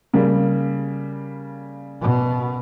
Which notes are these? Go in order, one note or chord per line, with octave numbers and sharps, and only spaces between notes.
C#3 G3 A#3
B2